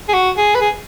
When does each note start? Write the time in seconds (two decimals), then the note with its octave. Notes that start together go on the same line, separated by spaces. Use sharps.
0.09 G#4
0.14 F#4
0.37 G#4
0.55 B4
0.61 G#4